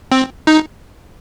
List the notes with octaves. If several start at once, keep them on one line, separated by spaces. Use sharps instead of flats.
C4
D#4